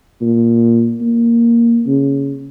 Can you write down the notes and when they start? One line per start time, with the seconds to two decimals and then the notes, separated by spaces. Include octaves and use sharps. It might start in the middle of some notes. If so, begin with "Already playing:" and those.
0.21 A#2
1.01 A#3
1.87 C#3